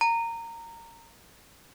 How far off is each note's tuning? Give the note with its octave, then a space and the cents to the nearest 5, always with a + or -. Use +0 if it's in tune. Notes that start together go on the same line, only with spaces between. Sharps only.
A#5 -15